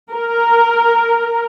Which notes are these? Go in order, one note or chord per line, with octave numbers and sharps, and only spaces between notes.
A#4